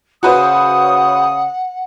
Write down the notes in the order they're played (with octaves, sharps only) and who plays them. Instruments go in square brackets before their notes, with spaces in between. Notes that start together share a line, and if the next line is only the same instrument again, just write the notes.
[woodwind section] C#3 D#6 [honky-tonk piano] F#4 B4 C5 [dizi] F#5